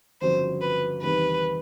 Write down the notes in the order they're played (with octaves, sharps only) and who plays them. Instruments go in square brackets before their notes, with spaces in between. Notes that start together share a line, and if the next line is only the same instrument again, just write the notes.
[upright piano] G1 F2 C#3 F#3 [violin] C5
[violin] B4
[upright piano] E2 C3 D#3 G3 [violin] B4